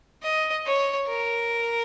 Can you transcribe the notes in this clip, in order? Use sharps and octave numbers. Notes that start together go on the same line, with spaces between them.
D#5
C#5
A#4